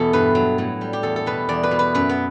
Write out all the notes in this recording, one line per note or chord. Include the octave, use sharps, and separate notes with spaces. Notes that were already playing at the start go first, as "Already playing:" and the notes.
Already playing: E2 B2 A4
G2 B4
F#3
A2
G3
G4
E2 A4
A4
B2 B4
E2 D5
B4
B2
B4
F#2 B4
B3